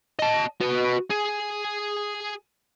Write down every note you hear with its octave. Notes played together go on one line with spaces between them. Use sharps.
D#5 A5
F#4 B4
G#4